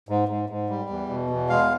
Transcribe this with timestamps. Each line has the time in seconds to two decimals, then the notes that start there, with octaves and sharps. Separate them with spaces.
0.09 G#2
0.29 G#2
0.50 G#2
0.69 G3
0.90 E2
1.09 B2
1.30 E2
1.49 G#3 F5